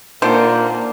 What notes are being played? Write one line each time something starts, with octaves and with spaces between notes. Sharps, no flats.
A#2 D3 D#3 A#3 C5